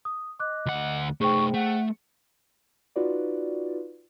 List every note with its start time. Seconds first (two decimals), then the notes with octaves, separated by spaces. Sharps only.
0.05 D#6
0.40 D#5 D6 F#6
0.66 D2 F#5
1.21 A3 D#4 G#4 C5 G5 C#6
1.54 A3 F#5
2.96 D#4 F4 F#4 B4 D5